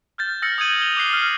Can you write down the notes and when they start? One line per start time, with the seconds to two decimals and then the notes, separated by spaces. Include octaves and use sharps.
0.18 F6 G6 A6
0.42 E6 F6 A6 A#6 C#7 F#7
0.58 D#6 G6 G#6 D#7 F#7
0.82 F7 G7
0.97 D6 F#6 C7 G7
1.13 F6 C7